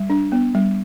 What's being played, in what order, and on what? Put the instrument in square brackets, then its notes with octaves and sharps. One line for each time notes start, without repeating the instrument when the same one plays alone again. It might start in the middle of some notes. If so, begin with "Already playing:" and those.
Already playing: [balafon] G3
D4
B3
G3